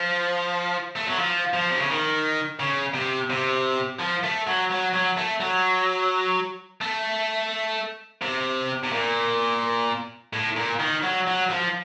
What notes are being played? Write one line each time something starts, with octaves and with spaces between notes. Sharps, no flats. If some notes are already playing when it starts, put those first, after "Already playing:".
Already playing: F3
A3
F#3
F3
F3
C3
C#3
D#3
C#3
C3
C3
F3
A3
F#3
F#3
F#3
A3
F#3
A3
C3
C3
A#2
A2
A#2
D#3
F#3
F#3
F3